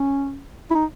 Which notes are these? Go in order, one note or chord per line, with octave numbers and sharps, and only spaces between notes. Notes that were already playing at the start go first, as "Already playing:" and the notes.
Already playing: C#4
E4
D#4